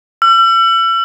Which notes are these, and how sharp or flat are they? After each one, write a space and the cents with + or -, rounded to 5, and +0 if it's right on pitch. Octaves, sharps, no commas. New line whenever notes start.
E6 +40